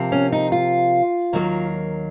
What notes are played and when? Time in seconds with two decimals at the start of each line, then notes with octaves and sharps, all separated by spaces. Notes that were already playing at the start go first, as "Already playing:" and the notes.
Already playing: C3 F3 A#3
0.12 C#4
0.32 D#4
0.52 F4
1.33 D#2 D#3 F#3 A#3